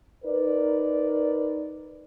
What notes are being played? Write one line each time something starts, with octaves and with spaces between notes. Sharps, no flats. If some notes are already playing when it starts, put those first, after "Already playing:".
D#4 A#4 B4 D5